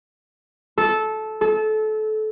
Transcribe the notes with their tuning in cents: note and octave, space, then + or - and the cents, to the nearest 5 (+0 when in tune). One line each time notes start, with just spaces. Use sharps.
A4 -15
A4 -25